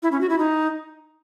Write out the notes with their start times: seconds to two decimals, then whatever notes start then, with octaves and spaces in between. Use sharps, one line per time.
0.03 E4
0.12 C#4
0.21 F#4
0.30 E4
0.39 D#4